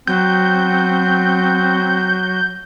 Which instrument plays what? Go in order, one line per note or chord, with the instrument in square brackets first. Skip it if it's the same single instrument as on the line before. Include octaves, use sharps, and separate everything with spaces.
[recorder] F#3 [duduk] C4 [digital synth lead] G6